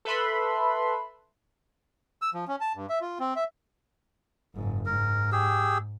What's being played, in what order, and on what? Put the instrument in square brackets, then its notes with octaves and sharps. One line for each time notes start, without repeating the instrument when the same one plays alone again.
[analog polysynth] A4 B4 E5 B5 C6
[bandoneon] E6
F3
C#4
A5
G2
E5
F4
C4
E5
[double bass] F#1 G#2
[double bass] G#2 [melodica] A#4
[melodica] G4 G#4 E6